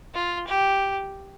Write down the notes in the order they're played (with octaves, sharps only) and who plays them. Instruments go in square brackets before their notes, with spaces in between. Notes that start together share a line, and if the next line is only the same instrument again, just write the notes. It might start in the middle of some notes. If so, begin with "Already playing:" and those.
[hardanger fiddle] F4
G4